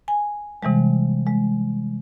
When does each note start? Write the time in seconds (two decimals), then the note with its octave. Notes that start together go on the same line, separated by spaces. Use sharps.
0.08 G#5
0.63 C3 E3 G3 G#3
1.27 G#3